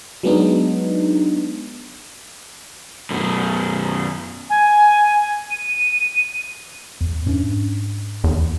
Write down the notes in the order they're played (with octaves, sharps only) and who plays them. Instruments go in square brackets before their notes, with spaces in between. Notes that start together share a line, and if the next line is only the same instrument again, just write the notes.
[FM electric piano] F#3 G#3 B3 D4 D#4
[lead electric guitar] F#2 B2
[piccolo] G#5
D#7
[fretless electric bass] E2
G#2 C#4 D4
[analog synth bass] E2